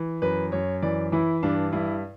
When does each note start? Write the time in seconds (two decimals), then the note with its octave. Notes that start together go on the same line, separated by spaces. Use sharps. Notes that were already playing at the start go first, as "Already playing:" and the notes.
Already playing: E3
0.22 F#2 B4
0.52 F#2 C#5
0.82 E3 D5
1.12 E3 E4
1.43 G2 D4
1.72 G2 E4